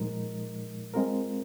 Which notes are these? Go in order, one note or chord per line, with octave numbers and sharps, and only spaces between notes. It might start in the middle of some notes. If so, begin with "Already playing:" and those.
Already playing: A#2 F3 G#3 D#4 A#4
G#3 C4 F4 A#4